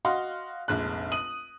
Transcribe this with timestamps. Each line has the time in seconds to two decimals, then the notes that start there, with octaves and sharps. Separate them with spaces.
0.05 F#4 D#5 F5 C6
0.68 F1 A#1 G#3 F#6
1.12 D#6 D#7 F#7